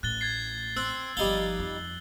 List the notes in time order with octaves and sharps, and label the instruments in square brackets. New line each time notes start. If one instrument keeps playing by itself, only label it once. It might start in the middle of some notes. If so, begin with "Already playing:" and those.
[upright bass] A1 A2 [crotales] F#6 A6 G7
[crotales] G#6 A6 C7
[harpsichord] C4 [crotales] E6 F#6
[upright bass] G1 F3 [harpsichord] G3 D#4 F5 [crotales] G7
[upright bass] F2